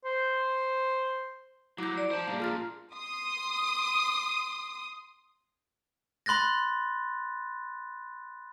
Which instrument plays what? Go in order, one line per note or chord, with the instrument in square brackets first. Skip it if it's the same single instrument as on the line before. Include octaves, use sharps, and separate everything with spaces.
[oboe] C5
[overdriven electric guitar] F#3 [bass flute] E4 [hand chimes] D6 G6
[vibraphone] D5
[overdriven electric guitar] C5 A5
[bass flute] G3 [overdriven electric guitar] A#3 D4 [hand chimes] A#5
[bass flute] F4 [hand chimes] G#4 F6 A6
[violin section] C6 D#6
[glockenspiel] B5 C6 F#6 A6 A#6